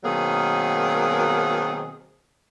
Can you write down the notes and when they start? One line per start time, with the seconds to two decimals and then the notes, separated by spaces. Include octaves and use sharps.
0.04 B2 D#3 F#3 A#3 C4 G#4